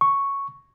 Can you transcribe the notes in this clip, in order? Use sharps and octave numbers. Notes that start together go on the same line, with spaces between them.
C#6